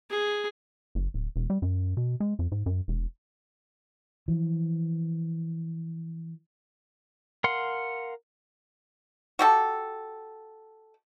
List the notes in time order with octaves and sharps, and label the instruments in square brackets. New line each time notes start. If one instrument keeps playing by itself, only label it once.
[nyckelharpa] G#4
[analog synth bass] F#1
D1
E1
G3
F#2
B2
G#3
F2
G#2
F#2
E1
[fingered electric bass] E3 F3
[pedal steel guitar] A#4 F5 F#5 C6
[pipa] F#4 G4 A4